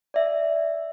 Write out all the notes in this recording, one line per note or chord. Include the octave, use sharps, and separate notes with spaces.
D5 E5